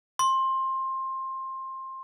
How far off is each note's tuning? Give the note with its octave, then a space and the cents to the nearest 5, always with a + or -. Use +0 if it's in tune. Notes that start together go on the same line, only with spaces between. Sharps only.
C6 +20